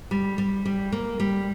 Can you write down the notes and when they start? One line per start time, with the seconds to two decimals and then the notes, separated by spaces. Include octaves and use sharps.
0.11 G3
0.38 G3
0.65 G3
0.92 A#3
1.20 G3